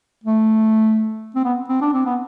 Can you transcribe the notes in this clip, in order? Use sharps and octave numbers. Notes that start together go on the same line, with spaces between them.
A3
C4
B3
C4
D4
C4
B3